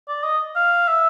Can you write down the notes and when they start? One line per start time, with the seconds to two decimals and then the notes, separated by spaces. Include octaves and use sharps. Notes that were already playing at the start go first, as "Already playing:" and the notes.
0.08 D5
0.24 D#5
0.56 F5
0.88 E5